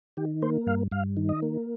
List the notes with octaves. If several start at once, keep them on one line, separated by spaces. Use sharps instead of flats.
D#3 G4
A#3 C5
G2 F5
G2 F5
D#3
D#5
A#3